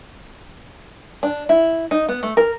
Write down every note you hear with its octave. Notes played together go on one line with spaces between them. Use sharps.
D4
E4
D#4
B3
A3
A#4